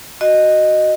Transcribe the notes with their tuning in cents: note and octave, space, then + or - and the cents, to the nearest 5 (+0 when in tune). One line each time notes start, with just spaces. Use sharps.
F#4 +0 D#5 -10